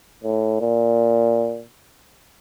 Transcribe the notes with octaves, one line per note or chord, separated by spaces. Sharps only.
A2
A#2